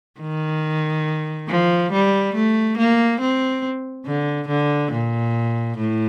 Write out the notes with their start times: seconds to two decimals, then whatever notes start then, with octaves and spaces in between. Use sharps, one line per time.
0.20 D#3
1.48 F3
1.92 G3
2.35 A3
2.78 A#3
3.20 C4
4.06 D3
4.48 D3
4.92 A#2
5.77 A2